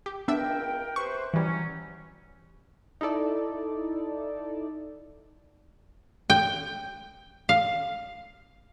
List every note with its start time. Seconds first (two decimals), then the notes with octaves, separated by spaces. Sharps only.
0.06 G4
0.28 C#2 B3 D4 A#4 E5 G5
0.96 C3 B4 C5 C#6
1.34 E3 F#3 G3 C#4
3.01 D#4 E4 A4 D5
6.30 G5
7.49 F5